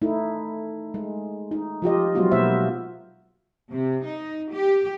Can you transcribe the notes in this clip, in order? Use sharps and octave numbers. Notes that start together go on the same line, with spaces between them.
A3 D#4 E4
G#3
D#4
F3 F4 G4 D#5
F#3 G#3 B3 F4 F#4
B2 A#3 B3 C5 E5
C3
D#4
G4